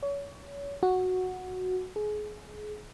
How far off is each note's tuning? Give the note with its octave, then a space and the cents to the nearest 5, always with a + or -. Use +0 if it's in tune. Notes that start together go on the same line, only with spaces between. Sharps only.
C#5 +30
F#4 -5
G#4 +25